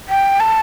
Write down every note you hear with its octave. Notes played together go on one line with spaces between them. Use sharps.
G5
A5